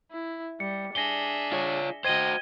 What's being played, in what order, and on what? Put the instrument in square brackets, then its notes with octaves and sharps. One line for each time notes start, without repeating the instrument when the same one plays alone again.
[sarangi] E4
[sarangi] G3 [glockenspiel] C#7
[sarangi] D4 [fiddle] G#4 E5 [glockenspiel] A#6 G7
[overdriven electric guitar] F4 C#5
[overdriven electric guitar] F#4 C5 [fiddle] D#5 [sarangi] G5 [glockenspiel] G#6 D#7 G7